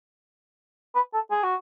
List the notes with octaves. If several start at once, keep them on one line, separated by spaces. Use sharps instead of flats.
B4
A4
G#4
F#4